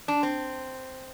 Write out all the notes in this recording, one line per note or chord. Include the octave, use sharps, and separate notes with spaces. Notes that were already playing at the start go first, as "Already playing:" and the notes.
D4
C4